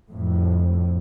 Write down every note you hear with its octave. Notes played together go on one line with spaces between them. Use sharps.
F2 A2